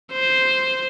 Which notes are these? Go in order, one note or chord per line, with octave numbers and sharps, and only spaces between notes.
C5